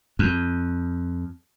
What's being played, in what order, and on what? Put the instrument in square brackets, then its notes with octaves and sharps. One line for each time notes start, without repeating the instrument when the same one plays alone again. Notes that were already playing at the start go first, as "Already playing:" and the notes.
[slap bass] F2